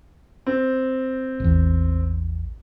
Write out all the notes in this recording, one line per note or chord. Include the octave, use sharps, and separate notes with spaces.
C4
A1 E2